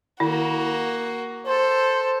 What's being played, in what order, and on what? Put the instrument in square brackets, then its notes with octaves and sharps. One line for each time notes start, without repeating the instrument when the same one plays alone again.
[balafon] D#3 E4 [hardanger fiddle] A#3 F#4
[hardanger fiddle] A4 [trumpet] C5